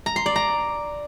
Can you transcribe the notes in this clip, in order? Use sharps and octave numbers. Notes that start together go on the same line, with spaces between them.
A#5
C6
D5
A#5